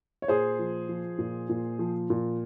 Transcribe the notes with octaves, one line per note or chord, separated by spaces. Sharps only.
C#5
A#2 G#4 C5
F3
F3
A#2
A#2
F3
A#2